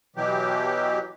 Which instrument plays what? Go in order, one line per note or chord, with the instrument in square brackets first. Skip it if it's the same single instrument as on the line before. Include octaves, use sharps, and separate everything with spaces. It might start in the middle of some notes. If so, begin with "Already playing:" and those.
[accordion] B2 E3 F#3 G4